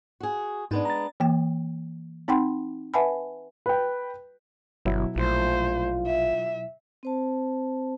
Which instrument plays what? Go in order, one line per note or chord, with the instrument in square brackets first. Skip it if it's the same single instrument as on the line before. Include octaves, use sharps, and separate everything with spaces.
[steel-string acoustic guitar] F#4 G#4
[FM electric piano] G#2 D#4 [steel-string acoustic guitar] G#3 B3 D4
[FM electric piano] A#5 A6
[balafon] E3 A#3 G5
C4 D#4 F#5 G5 B5 C6
B4 E5 F#5 G#5 A5 B5
[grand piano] B4 G5
[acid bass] G1 [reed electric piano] B2 F#3 E4
[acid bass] A#1 [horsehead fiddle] A3 C5 [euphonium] F4
[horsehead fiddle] E5
[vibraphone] C4 C5 A5